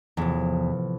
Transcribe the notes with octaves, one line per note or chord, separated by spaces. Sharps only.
A1 E2 C3 F3